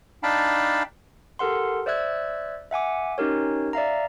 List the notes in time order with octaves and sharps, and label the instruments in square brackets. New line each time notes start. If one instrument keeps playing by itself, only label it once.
[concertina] D4 D#4 F5 G5 A5 B5
[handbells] G4 A4 A#4 F#5 C6
C5 D5 E5 E6 F#6 G#6
E5 F#5 G#5 D6
C#4 D#4 G4 A#4 C#5
D5 E5 F5 A#5